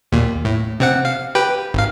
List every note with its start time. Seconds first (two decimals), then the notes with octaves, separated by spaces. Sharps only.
0.12 D#2 A#2
0.45 A2
0.80 C3 C4 F#5
1.05 F5
1.35 G4 B4 G5
1.74 G#1 F5